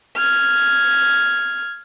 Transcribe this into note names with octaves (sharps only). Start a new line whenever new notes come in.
F6 G#6